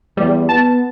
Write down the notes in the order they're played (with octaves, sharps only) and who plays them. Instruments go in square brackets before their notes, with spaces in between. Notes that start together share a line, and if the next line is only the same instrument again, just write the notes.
[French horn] E2 [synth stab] G3
[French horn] B3 [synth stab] A5